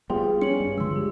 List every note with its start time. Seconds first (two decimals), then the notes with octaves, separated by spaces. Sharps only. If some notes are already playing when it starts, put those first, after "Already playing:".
0.10 F3 G3 B3 G#4 G5 C6
0.42 C#4 C#7 F#7
0.60 G2
0.78 D3 F3 G#3 C6 E6
0.96 G4